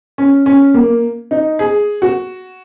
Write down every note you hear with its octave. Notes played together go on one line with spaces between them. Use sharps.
C#4
C#4
A#3
D#4
G#4
F#4